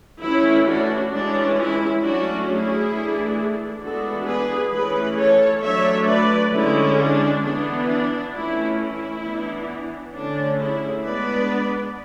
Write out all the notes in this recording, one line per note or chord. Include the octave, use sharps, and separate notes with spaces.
E3 A3 C#4 E4
D4 F#4
E3 G#3 C#4 D4
E4
F#3 A3 C#4 D4 F#4
E4 G#4
E3 A3 D4
E3 G#3 B3 D4 F#4 A4
G#4 B4
E3 A3 C#4 G#4 B4
A4 C#5
F#3 A3 D4 C#5 E5
B4 D5
D3 G#3 C#4 E4
D4
E3 B3 D4
D4
E3 A3 C#4 E4
E4
E3 B3 D4
D3 A3 C#4 D4
E4 G#4
G#3 B3 D4 B4 D5